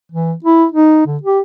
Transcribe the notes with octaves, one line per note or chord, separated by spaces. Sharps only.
E3
E4
D#4
D3
G4